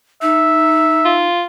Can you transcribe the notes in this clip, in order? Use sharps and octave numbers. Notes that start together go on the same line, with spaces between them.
D#4 E5
F4